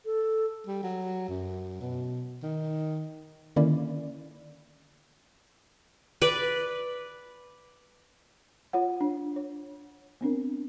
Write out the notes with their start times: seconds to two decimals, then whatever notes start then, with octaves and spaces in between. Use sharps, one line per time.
0.05 A4
0.67 G3
0.83 F#3
1.29 F#2
1.81 B2
2.43 D#3
3.56 D3 D#3 A#3 C#4 E4 D5
6.22 B4 D5
8.73 F4 C#5 F#5
9.01 D4
9.36 C#5
10.21 B3 C4 D4 A#4